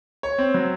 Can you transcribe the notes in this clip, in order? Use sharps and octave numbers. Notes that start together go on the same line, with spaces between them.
C#5
C4
F#3